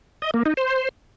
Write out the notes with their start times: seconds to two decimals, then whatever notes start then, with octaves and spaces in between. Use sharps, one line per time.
0.22 D#5
0.34 A#3
0.46 D#4
0.57 C5